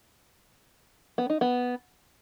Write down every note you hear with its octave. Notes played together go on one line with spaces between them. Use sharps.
B3
D#4
B3